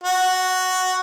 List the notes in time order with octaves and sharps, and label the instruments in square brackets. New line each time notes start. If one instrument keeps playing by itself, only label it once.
[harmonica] F#4